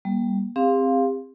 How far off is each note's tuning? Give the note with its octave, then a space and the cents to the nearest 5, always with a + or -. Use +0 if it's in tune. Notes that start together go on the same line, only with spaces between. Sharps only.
G3 +0 A#3 +40
C4 +5 G4 +45 F5 +0